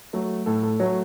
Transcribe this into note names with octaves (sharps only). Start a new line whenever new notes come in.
F#3 A3
A2 A4
A4
F#3 A3 C#5